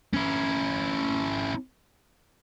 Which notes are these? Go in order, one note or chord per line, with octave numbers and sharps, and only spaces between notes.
C#4 E4